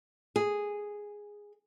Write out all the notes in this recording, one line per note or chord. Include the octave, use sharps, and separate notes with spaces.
G#4